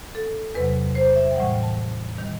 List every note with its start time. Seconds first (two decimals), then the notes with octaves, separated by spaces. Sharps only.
0.15 A4
0.55 E2 C3 F#3 B4
0.95 C5
1.16 E5
1.32 G5
1.36 A2 E3 G3 F#5
1.63 A5
2.17 D#3 G3